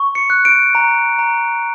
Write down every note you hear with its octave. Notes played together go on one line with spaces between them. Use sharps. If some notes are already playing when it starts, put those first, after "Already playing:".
Already playing: C#6
C#7
F#6
D7
A#5
A#5